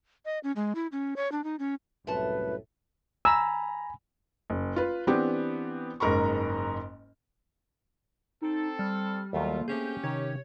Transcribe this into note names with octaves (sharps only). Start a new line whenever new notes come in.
D#5
C#4
G#3
E4
C#4
C#5
D4
D#4
C#4
C2 F#2 A2 A3 B4 A5
G#5 A#5 B5 E6
F#1
F4 B4
E3 B3 C4 D4 G4
F#1 G#2 A#4 A#5 B5 C#6
C4 D#4 A4
G3 F6
D#2 F#3 A3 A#3 F4
A3 C4 C#4 G4 G#4 G6
C3 D#3 C#5